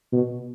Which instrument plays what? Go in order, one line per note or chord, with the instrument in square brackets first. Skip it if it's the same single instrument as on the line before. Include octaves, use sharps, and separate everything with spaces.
[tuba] B2